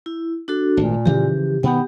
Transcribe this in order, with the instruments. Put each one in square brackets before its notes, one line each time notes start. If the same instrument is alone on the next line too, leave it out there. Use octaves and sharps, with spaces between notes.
[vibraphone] E4
D4 F#4 A4
[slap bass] G#1 [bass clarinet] A#2 [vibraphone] A3
[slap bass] C#3 E3 F3 [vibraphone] G4
[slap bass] B2 D#3 [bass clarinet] B3 [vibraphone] G4 G5